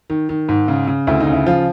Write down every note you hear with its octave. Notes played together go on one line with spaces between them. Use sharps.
D#3
D#3
G#2
C#3
C#3
D2 E4
D#4
C#3
E4
F3 F4